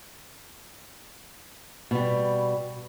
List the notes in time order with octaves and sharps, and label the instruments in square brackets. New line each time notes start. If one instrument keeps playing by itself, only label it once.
[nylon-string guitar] B2 G3